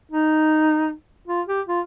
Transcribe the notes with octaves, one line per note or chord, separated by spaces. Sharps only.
D#4
F4
G4
F4